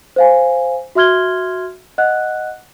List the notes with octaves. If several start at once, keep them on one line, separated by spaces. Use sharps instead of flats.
C5 F5 G#5
F#4 E5 C6 F6 G#6 G7
D#5 F#5 F#6